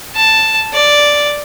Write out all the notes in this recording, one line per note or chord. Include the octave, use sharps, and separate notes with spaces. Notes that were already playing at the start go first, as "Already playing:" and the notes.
A5
D5